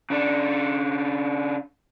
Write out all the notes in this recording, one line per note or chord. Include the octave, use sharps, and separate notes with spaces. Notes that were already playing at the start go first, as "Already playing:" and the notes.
C#3 D4